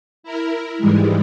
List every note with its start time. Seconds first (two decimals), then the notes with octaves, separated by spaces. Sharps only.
0.23 E4 A#4
0.78 G#2 E3 G3 G#3